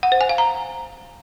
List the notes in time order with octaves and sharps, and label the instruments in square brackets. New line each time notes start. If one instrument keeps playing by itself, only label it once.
[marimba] F#5
C5
G#5
F5
A#5